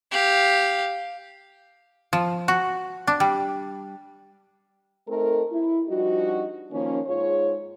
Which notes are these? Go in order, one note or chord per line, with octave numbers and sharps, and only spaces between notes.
G4 F5
F3
F#4
D4
G3
A3 C4 D#4 A4 A#4
E4
F3 G3 D4 D#4 F#4
D#3 F3 A#3 C#4
G#2 F4 G#4 C#5